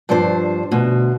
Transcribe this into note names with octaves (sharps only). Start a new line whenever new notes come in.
G2 F3 D4 C5
D2 B2